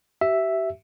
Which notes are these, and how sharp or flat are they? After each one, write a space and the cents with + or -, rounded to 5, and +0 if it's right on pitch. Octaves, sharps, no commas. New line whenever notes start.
G4 -35 E5 +0